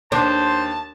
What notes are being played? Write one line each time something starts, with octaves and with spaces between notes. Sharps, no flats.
D#2 D4 C5 A5